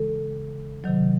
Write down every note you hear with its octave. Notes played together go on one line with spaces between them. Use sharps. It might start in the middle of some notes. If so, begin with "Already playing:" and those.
Already playing: C#3 E3 G#3 A4
C3 D#3 F#3